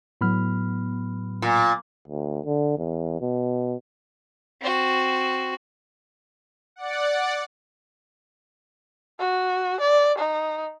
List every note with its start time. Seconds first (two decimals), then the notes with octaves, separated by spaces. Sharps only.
0.21 A2 F#3 B3 B5 F6
1.42 A#2
2.08 D2
2.45 D3
2.78 E2
3.21 B2
4.61 C4 F#4
6.76 D5 F#5
9.19 F#4
9.81 D5
10.18 D#4